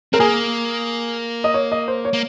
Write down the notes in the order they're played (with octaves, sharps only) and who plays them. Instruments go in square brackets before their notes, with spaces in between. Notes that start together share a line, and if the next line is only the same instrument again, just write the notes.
[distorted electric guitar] C4 [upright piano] A#4
[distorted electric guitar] A#3 [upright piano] G#4
[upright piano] D#5
C#5
D#5
C5
C#5
[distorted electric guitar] A#3